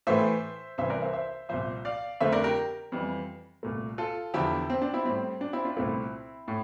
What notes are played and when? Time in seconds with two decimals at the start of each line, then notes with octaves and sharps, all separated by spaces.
0.07 A2 E3 A3 C5 E5
0.78 C2 C3 E3 C5 E5
0.90 A#4 D5
1.02 C5 E5
1.13 C5 E5
1.49 C2 A#2 F3 C5 E5
1.85 D5 F5
2.20 F2 D3 A3 C5 E5
2.32 A#4 D5
2.44 G4 A#4
2.92 F2 E3 G3
3.63 C2 A#2 A3
3.98 F4 A4
4.34 E2 D3 F3 E4 G4
4.70 C4
4.82 D4
4.93 C4 E4
5.05 A2 G3 C4
5.41 D4
5.53 C4 E4
5.65 D4 F4
5.77 C2 A#2 A3 C4 E4
6.48 A2